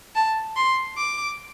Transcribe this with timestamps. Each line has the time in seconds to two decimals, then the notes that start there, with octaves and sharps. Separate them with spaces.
0.15 A5
0.56 C6
0.97 D6